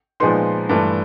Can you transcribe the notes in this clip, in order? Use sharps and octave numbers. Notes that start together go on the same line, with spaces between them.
A#2 F3 G#3 B3 D#4 C6
G2 E3 A3